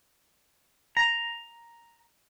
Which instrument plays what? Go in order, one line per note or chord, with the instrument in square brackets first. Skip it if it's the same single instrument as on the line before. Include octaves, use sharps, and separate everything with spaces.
[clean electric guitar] A#5